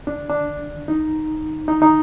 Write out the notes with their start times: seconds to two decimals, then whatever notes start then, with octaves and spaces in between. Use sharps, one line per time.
0.07 D4
0.30 D4
0.88 D#4
1.68 D#4
1.82 D#4